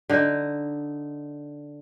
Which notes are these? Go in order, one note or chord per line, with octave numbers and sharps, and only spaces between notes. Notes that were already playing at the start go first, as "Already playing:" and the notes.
D3 D#4